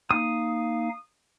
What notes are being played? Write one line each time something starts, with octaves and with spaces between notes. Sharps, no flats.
A#3 D#4 F5 D#6